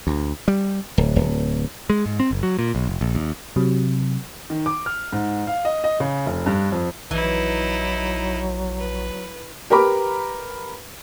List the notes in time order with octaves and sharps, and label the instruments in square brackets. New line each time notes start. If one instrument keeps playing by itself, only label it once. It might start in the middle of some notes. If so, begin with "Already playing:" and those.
[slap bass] D2
G3
D1
D1
[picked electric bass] G#3
G#2
C4
F#1
F#3
A#2
B1
F1
A#1
D#2
[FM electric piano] C3 F#3
[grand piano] D#3
D6
F6
G#2
F5
D#5
D#5
C#3
F1
G2
F2
[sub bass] A#1 [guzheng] E3 [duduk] F#3 [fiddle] D#4 E4
[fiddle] B4
[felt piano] G4 A#4 B4 A#5 B5 D6